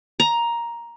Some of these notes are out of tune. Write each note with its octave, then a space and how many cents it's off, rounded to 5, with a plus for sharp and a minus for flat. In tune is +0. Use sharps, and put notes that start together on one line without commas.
A#5 +10